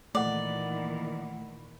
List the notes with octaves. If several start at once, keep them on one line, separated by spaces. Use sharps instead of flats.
A#2 D#3 E3 A3 D5 F#5